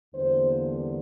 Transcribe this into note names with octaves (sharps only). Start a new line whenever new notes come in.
E2 D3 G3 A#3 C5